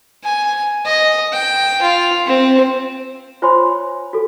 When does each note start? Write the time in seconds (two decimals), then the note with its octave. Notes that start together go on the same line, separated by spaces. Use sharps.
0.24 G#5
0.86 D#5
1.33 G5
1.82 F4
2.26 C4
3.42 F4 C5 C#5 G#5 B5 C6
4.13 F#4 A4